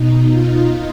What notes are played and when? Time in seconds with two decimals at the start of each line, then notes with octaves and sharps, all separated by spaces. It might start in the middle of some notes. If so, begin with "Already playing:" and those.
Already playing: B2 D#4
0.31 F4